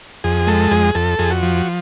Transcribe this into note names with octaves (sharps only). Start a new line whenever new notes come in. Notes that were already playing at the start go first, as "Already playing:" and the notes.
F2 G#4
G#3 A4
F2 G#4
F2 A4
F2 G#4
F#4
F3